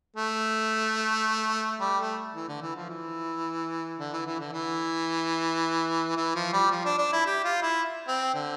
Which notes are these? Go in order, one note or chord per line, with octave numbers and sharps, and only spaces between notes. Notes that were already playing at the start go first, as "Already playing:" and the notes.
A3
G3
A3
E3
D3
E3
F3
E3
D3
E3
E3
D3
E3
E3
F3
G3
F3
D4
D4
E4
G4
F4
E4
C4
D3